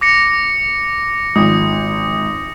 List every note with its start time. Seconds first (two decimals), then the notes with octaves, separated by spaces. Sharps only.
0.01 D6 A#6 C#7
1.36 G#1 F3 D#6